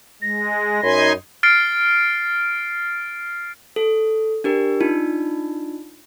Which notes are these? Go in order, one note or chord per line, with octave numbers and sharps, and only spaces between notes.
G#3 A#6
F#2 D#4 G#5 B5 C6
F6 A6 C7 D7
A4
D4 G4 A#4
D4 D#4 F4